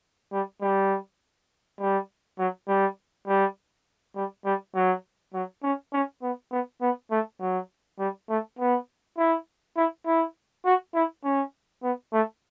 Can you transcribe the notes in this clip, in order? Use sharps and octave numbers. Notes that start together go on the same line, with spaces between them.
G3
G3
G3
F#3
G3
G3
G3
G3
F#3
F#3
C#4
C#4
B3
B3
B3
A3
F#3
G3
A3
B3
E4
E4
E4
F#4
E4
C#4
B3
A3